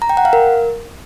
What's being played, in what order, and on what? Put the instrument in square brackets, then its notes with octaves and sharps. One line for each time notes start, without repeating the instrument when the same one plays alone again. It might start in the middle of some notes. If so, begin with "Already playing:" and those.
[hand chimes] A#5
G5
F#5
F5
A#4